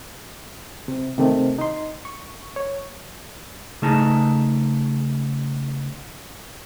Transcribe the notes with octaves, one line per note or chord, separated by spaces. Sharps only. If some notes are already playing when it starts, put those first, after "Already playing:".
C3
C3 D#3 A3 C4
D#4 C6
C#6
C#5
C#3 A3 D#4 G#4 A5 A#5